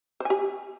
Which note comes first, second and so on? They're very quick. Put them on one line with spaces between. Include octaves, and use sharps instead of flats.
C5 G#5 G4